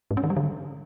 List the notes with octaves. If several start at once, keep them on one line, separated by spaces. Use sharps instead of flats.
G#2
C#4
D#3
G3
D3